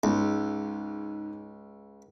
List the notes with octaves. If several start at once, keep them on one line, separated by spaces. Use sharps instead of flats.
C#2 G#2